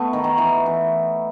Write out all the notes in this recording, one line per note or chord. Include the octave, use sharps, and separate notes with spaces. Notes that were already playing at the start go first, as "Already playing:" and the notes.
Already playing: A3 B3
D#3
D#3
E3
E3